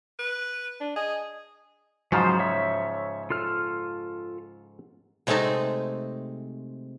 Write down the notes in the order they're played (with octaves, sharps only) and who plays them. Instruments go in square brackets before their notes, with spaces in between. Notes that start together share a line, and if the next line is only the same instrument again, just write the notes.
[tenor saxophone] B4
[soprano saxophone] D4
[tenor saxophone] G#4 [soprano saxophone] D#5
[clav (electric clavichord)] G#2 C#3 F3 [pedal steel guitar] F#3 C5
[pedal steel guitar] C#5 E5 E6
F4 A4 F6
[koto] C3 G#3 A3 C4 D#4 A5